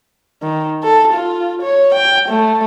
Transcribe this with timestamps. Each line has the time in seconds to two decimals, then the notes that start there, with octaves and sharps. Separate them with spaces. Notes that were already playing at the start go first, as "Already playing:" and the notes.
0.43 D#3
0.83 A4
1.13 F4
1.62 C#5
1.94 G5
2.29 A3